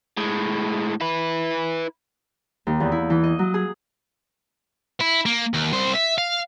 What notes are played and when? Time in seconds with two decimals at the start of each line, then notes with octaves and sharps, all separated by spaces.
0.17 A2 G#3
1.01 E4 B4
2.67 D#2
2.80 E2
2.92 E4
3.10 E3
3.24 D#5
3.39 F#3
3.54 G#4
5.01 E4
5.26 A#3
5.54 D#2
5.73 C2 C5
5.95 E5
6.18 F5